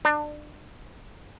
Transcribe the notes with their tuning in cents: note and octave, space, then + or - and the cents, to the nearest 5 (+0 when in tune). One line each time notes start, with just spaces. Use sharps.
D4 +30